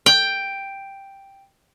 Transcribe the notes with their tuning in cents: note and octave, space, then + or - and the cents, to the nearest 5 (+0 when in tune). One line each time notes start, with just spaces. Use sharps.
G5 +5